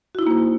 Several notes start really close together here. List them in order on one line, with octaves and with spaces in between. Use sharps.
F#4 E4 D#4 A#3 C5